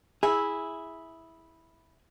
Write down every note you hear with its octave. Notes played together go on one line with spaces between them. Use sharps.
E4 G#4